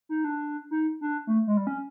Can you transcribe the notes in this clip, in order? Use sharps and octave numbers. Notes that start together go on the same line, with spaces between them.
D#4
D4
D#4
D4
A3
G#3
G3
C#4